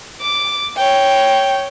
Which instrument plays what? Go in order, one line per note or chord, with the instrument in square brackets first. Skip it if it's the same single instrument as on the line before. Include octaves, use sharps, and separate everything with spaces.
[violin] D6
C#5 G5